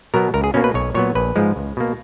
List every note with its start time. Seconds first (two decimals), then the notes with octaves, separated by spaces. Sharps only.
0.14 B2 F#3 B3 A#4
0.34 C#2 A#4
0.44 G#4
0.54 B2 A#3 C#4
0.64 B4
0.74 B1 C#5
0.94 A#2 F#3 B3 C#5
1.15 A#1 B4
1.36 G#2 F3 G#3
1.56 C#2
1.77 B2 A#3